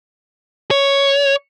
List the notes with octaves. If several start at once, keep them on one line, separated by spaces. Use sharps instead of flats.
C#5